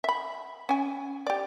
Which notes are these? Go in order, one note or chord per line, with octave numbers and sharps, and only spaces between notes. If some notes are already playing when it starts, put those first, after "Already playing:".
E5 B5
C#4 G#5
G4 D5